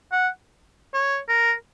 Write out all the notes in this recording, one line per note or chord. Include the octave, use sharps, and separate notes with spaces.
F#5
C#5
A#4